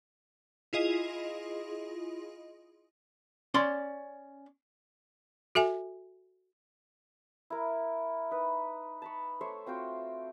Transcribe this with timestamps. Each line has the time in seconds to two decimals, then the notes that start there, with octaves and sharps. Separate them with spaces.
0.73 E4 F4 G#4 D#5
3.54 C#4 D5 C6
5.55 F#4 A4 E5 G#5
7.50 E4 A#4
8.31 D#4 B4
9.02 A5 B5 C#6
9.41 A3 C5 C#5 E5
9.67 C4 F4 F#4 G5